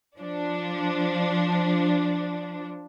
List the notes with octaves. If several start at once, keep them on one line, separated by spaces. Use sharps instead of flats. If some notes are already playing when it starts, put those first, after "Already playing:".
F3 D4